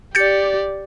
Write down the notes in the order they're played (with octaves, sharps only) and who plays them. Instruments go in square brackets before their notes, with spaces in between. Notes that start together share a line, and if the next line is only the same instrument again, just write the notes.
[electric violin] G4 D5 [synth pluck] G6 A6 C#7